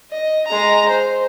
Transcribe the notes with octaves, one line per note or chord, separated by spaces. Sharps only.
D#5
G#3 A#5
C5